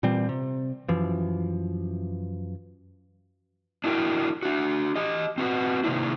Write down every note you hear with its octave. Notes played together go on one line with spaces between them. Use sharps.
A#2 E3 G3 C4
C3
F#2 E3 F3
D4 E4 F#4 A#4 G5
D4 F#4
G4 D#5
C4 F#4 B4 F#5
C3 D#3 A#3 D4 E4